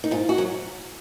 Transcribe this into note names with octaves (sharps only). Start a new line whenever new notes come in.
D#4
G#2 F4
F#4
F#3